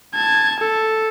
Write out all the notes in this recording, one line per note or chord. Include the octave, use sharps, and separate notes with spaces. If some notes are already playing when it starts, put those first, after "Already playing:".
A5 G#6
A4